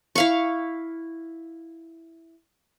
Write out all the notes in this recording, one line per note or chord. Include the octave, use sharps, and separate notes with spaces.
E4 F5 C#6